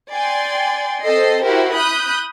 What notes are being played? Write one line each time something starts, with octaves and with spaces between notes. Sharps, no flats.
D5 G5 G#5 C6
C4 A4 C5 D#5 C7
E4 F#4 G4 A#4 C5
B5 D#6 F#6 G6